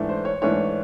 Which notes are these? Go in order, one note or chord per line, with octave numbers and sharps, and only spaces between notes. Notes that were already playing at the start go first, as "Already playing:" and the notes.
Already playing: G#2 E3 A3 D4
C5
C#5
G#2 E3 A3 D4 C#5